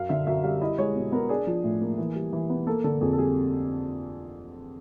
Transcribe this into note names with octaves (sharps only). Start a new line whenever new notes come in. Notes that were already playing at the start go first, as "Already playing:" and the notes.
Already playing: F#2 F5
D3 E5
F#2 E5
G3 F5
E4 D#5
G#3 C#5
B2
B3 A#4
D4 G#4
F3
A2
A#3
E3
G3
E3
B3
A#3 A4
D3 A4
F2 G#4
A4
G3 G#4